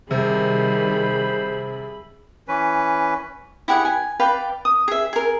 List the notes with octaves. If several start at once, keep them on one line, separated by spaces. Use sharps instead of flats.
C3 D#3 G3 G#4 C5 B5
E3 C#4 B4
E4 G4 G#4 F#5
G#5
B4 D5 F5 G5
D#6
G#4 E5
G#4 A#4